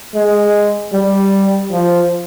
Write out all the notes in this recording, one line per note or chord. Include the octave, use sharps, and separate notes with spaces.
G#3
G3
F3